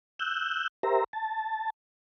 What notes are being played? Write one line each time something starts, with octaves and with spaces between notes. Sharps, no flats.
E6 F#6 G6
G4 A#4 C5 E5 A#5
A5